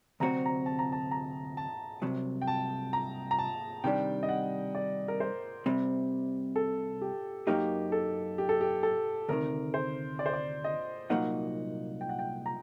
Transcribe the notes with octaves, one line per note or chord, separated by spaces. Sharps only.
D2 C3 F#3 C4 F#4 A#5
A#5
A5
A#5
A5
A#5
A5
C2 C3 F#3
G5
A5
A#5
A#5
A5
C3 D#3 G3 D4 G5
D#5
F#5
D5
A#4
C5
C2 C3 G3 C4
A4
G4
F#2 F#3 A#3 D#4 G4
A4
G4
A4
G4
A4
D2 C3 D#3 A#4
C5
D5
C5
D5
D#5
C2 A#2 F#3 A#3 D#4 F#5
G5
F#5
G5
A#5